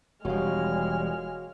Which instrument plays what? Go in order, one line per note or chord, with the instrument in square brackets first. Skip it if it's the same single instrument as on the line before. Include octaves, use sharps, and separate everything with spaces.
[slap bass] E1 F3 [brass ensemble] G3 [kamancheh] G#3 F6 [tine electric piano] F#4 C#5 F5